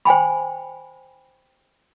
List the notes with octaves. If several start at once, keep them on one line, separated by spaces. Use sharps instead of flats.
C5 G5 G#5 B5